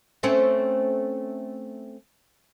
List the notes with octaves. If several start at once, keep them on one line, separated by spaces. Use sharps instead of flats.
A3 C4 C#4